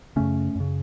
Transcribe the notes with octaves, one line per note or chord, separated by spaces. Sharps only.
F#2 C#3 A3 C#4
F#2 C#3